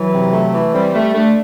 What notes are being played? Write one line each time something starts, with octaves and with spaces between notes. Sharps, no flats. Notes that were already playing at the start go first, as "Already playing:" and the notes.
Already playing: E3 F#3
C3
A3
E3
G3 C4
G3 A3
A3 D4